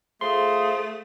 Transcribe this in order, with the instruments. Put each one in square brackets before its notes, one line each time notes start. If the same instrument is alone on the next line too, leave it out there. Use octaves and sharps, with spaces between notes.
[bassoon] F3 [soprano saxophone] A3 [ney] G#4 [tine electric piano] C6